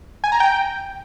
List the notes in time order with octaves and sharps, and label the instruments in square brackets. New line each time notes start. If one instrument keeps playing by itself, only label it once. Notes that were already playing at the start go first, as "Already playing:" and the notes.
[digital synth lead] G#5
A#5
G5